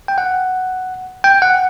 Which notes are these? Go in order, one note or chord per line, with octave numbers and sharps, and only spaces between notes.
G5
F#5
G5
F#5